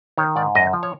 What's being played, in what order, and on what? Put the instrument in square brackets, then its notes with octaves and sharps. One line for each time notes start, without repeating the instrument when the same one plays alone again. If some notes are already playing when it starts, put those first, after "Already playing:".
[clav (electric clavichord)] D#3 C#5
G#2 D5
F#2 D#5
F3
C#5